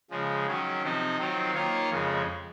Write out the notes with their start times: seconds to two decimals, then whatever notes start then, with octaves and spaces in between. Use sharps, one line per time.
0.10 C#3 F3 G#3
0.47 D#3 F#3 C#4
0.82 C3 F3 C4 D#4
1.18 D#3 F#3 C4 F4
1.54 D#3 A#3 F4 A#4 C#5
1.89 F2 C#3 G#3